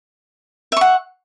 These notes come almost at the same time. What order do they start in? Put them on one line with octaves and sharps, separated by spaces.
E5 C#6 F#5